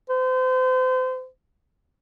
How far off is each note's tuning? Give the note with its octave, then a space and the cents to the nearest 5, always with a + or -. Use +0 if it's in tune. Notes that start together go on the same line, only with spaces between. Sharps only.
C5 -35